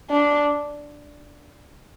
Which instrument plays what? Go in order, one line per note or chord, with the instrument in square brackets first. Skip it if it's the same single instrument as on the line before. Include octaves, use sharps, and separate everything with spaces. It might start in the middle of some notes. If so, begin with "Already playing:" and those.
[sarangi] D4